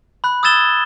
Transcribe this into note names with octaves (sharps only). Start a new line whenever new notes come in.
B5 F#6
D#6 E6 G#6 A6 E7 G7